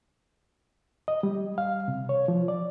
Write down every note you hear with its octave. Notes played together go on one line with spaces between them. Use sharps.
D#5
G3
F5
C3
C#5
F3
D5